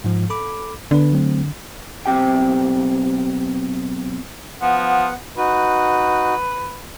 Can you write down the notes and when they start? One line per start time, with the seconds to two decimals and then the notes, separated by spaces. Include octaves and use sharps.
0.04 G#2 F3
0.30 A4 B5 D6
0.91 D3 B3 D4 B4
1.12 F#3 A3 C4
2.06 B1 C4 G4 G5
4.61 F3 B3 F#5
5.37 D#4 F#4 B4